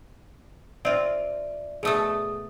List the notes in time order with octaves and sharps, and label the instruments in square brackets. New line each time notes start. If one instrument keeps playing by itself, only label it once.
[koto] C4 F4 [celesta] D5 E5
[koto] B2 A3 A4 [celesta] G#4 D#6